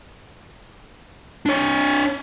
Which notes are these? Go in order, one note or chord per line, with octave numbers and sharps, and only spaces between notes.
D4 C#5